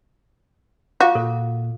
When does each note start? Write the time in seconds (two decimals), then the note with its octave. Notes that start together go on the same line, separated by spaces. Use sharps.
1.01 F4 F#4 F5 D6
1.15 A#2 A4